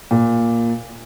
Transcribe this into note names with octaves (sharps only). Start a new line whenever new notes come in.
A#2